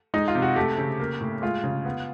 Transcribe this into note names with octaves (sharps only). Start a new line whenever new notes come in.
G#3 D#4
F4
C3
F#4
A3 G4
C#3
A#3
A2
G#3 F4
C#3
B3